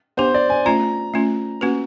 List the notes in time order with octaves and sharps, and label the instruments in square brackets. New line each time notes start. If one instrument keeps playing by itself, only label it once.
[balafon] B3 D4 G4 [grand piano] C5
[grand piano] D5
G#5
[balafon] A3 C#4 F4 [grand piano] A#5
[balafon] A3 C#4 F4
A#3 C#4 F#4 B4